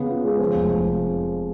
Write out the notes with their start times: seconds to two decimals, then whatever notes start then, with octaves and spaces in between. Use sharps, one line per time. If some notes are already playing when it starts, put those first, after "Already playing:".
Already playing: C#3 B3
0.09 F4
0.24 G#3
0.40 F3
0.55 F1
0.71 F1